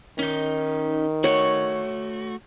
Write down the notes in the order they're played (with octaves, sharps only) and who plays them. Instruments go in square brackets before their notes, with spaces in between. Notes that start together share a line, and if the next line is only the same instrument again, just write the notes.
[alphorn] D#3 [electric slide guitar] C#4 D#4
[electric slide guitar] A3 F#4 [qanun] C#5